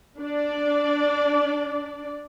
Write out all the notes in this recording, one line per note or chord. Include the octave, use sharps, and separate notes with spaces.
D4 D5